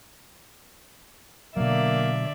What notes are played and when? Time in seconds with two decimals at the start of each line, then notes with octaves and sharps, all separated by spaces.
1.57 B2 D3 F#3 A#3 D5 E5